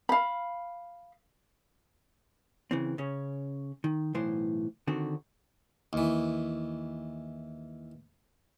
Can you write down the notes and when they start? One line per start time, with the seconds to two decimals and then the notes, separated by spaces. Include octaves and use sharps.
0.09 F5 B5
2.71 C#3 E3 C4
2.98 C#3 C#4
3.84 D#3
4.14 B1 A2 E3 C5
4.88 D3 D#3 C4 F#4
5.93 D#2 E3